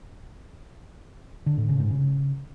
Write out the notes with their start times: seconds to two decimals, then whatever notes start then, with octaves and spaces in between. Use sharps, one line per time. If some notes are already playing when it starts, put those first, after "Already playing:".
1.46 D3
1.57 A2
1.69 C#3
1.80 G#2
1.91 C#3